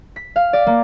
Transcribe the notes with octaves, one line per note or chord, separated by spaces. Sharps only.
B6
F5
D5
A#3